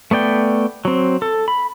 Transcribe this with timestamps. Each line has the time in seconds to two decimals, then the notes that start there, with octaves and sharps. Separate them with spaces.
0.11 A3 B3 D5 G5
0.85 F#3 C4
1.22 A4
1.48 B5